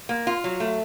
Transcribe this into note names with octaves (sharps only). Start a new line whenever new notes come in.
A#3
F4
F#3
A3